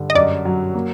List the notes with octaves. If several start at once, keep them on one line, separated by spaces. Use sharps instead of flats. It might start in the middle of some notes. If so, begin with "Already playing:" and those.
Already playing: G2 D3
D#5
F#2 D5
F#3
A#3